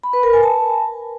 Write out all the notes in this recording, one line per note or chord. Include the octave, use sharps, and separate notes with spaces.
B5
B4
A#4
G#5
A5